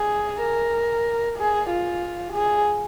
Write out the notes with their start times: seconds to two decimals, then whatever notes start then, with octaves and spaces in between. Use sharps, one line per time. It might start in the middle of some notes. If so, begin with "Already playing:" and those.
Already playing: G#4
0.42 A#4
1.38 G#4
1.70 F4
2.33 G#4